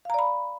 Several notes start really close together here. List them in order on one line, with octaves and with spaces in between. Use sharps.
F5 A#5 D5 B5